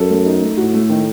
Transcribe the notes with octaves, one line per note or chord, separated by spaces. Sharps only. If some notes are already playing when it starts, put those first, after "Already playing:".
Already playing: F#2 A4
A3
D#4
A3
A2 F#4
A3
D#3